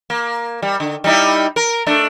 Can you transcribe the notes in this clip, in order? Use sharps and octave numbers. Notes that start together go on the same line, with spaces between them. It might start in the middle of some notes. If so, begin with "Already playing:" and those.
A#3
G3
D3
G3 D#4 E4
A#4
A3 D4